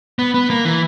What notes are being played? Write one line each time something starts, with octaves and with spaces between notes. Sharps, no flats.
B3
B3
A#3
E3